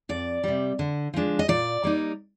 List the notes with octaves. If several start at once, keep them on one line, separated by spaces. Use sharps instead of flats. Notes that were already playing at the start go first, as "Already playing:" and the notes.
F2 D5
C3 G3
D3
F3 G#3 D4
D#5
A#2 D5
G3 A#3 D#4